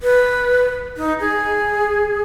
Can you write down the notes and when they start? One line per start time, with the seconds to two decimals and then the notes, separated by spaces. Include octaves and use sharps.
0.02 B4
0.97 D#4
1.20 G#4